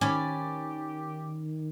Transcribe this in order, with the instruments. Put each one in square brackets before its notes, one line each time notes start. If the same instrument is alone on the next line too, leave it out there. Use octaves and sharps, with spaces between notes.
[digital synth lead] D#3 [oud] C#4 [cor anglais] G4 [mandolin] D5 B5